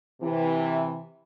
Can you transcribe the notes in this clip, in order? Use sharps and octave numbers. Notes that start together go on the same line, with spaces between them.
C3 E3